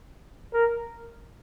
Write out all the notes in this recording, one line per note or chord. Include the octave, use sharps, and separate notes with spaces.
A#4